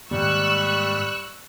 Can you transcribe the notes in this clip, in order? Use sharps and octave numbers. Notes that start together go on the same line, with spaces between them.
G#2 D#3 G3 A#3 C#6 E6 F#6